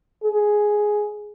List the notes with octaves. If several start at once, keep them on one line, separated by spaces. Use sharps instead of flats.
G#4